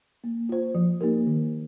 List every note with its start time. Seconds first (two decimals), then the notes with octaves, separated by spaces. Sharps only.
0.24 A#3
0.49 F4 C5
0.75 F3
1.01 A#3 D#4 G4 A#4
1.27 D#3